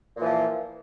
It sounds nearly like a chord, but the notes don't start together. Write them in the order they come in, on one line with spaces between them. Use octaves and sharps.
A#2 E3 F3